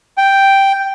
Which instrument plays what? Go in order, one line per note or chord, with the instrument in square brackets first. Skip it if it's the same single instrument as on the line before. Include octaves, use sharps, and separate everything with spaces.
[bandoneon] G5